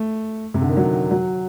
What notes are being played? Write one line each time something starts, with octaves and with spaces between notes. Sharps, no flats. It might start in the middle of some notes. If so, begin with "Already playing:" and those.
Already playing: A3
C3
D3
D#3
F#3
F#3